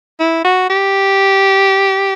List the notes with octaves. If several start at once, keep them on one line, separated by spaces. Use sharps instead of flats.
E4
F#4
G4